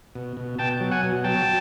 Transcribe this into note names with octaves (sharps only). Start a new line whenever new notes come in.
B2
B2
B2 G5 A5
F#3
F#5 G#5
B2
F#3 G5 A5